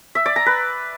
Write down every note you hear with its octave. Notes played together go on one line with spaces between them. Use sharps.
E5
D5
A#5
B4